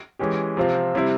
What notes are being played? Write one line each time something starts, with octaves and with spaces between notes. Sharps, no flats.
E3 G#3 C#4 G4
C3 F3 C4 F4
C3 G3 C4 E4